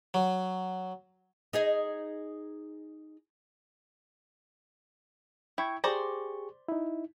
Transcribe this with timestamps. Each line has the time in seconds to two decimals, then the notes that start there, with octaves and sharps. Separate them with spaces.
0.14 F#3
1.53 D#4 G#4 D#5
5.58 E4 G5 C#6 G#6
5.84 G4 G#4 C5 D5 A#5 C#6
6.68 D#4 E4